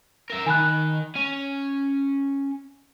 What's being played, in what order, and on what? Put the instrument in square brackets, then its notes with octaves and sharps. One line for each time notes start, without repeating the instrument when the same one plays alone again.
[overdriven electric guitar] A#4 E5
[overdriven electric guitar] D#3 [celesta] G#5 B5 F#6
[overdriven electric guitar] C#4 [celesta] D#7